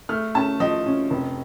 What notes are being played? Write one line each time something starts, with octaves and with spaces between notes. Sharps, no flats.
A3 F6
C#4 A5
F3 D#5
C#4
F1